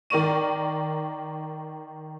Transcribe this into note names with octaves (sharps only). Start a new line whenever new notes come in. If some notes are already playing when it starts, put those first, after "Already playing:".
D#3 A#4 D5 C#6 D#7